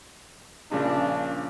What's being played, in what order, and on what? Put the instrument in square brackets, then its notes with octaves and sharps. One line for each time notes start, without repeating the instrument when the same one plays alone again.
[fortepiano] A#1 C#3 [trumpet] D4